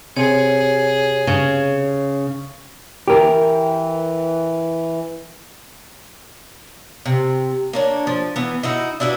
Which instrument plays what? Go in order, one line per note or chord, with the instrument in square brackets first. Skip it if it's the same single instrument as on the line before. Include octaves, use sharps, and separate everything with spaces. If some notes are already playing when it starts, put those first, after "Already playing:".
[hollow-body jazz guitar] C3 [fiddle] G#4 [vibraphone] C#5
[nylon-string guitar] C#3
[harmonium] E3 [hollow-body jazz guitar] G4 A#4
[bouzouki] C3
A#3 D4 C#5
F3
E3 B3
D#4 E4 F#4
D4 E4 F#4 B4